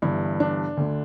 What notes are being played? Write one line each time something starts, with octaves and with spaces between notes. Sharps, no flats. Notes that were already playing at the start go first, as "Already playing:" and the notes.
G1 G2 E3 E4
D4
D2 D3